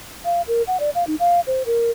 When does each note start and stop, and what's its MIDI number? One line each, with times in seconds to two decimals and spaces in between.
0.25 0.42 77
0.47 0.62 70
0.67 0.80 78
0.80 0.90 74
0.95 1.06 77
1.07 1.15 63
1.20 1.40 77
1.47 1.63 72
1.66 1.91 70